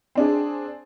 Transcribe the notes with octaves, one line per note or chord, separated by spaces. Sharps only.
C4 D4 G#4